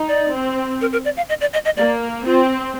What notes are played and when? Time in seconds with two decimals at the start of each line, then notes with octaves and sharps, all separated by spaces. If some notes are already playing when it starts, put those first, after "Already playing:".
Already playing: D#4
0.08 D5
0.32 C4
0.81 A#4
0.92 A#4
1.05 D5
1.17 F5
1.29 D#5
1.41 D5
1.53 D#5
1.65 D#5
1.77 A#3 D5
2.25 C4 F4